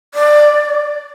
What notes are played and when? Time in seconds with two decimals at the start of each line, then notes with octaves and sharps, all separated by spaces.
0.15 D5